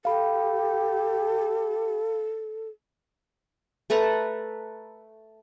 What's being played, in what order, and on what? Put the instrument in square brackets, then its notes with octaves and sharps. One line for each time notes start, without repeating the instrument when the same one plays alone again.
[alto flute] G4 [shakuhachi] A4 [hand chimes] F5 B5
[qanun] A3 A4 B4 A#5